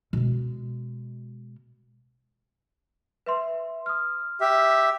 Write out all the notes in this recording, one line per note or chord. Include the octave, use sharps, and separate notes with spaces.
B2 G#3
B4 E5 C6
D#6 F6
G4 E5